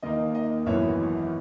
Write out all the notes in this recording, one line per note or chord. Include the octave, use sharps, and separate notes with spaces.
D#2 D#3 A#3 D#4 D#5
D#5
G#1 F#2 E3 B3 E4 C#5 E5